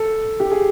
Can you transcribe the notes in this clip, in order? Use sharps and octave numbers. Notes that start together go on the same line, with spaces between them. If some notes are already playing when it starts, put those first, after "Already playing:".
Already playing: A4
G4
G#4